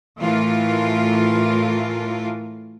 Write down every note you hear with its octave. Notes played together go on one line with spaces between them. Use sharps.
A2 E3 A3 F4 A4 A#4